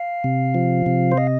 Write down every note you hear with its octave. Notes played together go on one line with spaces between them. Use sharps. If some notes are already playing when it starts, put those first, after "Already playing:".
Already playing: F5
C3
F3
C3
C5
D#5